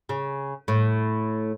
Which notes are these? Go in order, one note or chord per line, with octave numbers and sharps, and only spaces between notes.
C#3
A2